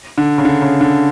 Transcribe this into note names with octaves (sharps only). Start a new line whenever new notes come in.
D3
C#3
D3
C#3
D3